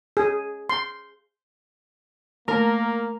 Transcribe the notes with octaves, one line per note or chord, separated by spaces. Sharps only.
G#4
C6
A3 A#3 A#4